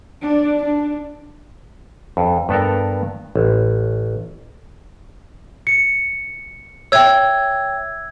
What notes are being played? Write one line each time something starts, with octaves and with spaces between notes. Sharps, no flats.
D4 D5
D4
F2
G2 B3 A4 A#4
A1
C#7
C#5 E5 G5 E6 G#6